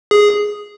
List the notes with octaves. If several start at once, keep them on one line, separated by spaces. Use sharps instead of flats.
G#4